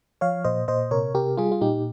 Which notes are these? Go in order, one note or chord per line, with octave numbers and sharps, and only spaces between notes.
F3 C#5 F5
A#2 C5 D#5
A#2 C5 D#5
C3 A#4 C#5
C3 G4 A#4
G3 F4 G#4
F4
A#2 D#4 G4